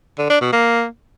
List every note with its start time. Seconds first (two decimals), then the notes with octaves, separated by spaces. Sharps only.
0.18 D3
0.30 D4
0.41 B2
0.53 A#3